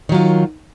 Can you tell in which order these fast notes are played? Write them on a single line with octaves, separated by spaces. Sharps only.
D#3 F#3 F4